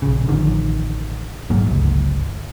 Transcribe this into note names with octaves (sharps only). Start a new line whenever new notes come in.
A#1 C#3
A1 D3 D#3 F3
A#1 G#2 F#3 A#3
G1 C#2